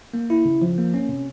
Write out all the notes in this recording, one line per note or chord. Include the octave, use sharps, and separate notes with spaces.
A#3
E4
C#3
F3
A#3
C#4
C3